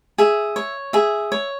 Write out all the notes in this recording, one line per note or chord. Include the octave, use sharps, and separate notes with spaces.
G#4 E5
C#5
G#4 E5
C#5